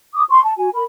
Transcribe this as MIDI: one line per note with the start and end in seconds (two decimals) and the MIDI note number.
0.14 0.23 86
0.14 0.23 87
0.29 0.42 84
0.29 0.42 85
0.43 0.53 81
0.57 0.68 66
0.57 0.68 80
0.74 0.82 70
0.74 0.82 83